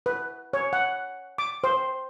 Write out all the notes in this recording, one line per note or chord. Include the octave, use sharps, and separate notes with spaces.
B4
C#5
F#5
D6
C5